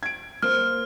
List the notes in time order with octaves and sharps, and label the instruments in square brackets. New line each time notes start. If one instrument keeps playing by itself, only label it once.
[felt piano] G#6 D7
[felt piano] A#3 C5 [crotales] F6